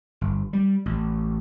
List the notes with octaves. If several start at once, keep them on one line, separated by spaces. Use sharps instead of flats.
G1
G3
A1